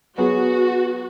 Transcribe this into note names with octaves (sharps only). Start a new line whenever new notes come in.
F#3 B3 F#4 G#4 B4